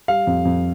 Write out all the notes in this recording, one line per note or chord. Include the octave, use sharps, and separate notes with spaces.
G3 F5
F2
F2